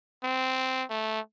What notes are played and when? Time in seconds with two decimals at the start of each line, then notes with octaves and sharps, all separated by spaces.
0.23 C4
0.90 A3